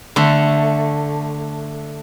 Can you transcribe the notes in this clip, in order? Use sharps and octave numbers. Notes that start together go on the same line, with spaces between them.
D3 A3